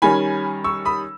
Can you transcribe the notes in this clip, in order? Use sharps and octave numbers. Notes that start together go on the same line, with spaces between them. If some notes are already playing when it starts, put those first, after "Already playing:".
D#3 G3 C#4 G#5 B5
C#6 E6
B5 D#6